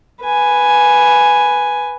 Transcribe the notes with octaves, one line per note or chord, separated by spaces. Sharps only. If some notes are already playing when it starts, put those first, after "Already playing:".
B4 G#5